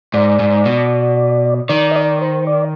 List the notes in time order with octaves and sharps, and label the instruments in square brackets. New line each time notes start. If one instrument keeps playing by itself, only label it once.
[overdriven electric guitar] G#2 [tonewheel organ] D5
[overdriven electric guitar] G#2
B2
[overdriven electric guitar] D#3 [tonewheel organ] D5
[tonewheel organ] D#5
D5
C5
D5